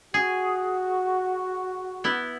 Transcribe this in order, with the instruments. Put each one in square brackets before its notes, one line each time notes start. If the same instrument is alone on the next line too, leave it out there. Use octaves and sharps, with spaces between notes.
[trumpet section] F#4 [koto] G#4
[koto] B3 E4